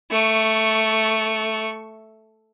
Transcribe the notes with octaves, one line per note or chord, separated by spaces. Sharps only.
A3 C#6